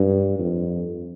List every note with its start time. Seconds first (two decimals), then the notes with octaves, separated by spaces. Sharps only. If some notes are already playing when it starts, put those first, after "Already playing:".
Already playing: G2
0.39 F2